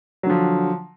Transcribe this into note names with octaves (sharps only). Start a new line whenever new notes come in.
D3 F3 F#3